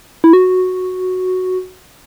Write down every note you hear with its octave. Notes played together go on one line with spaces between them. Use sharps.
E4
F#4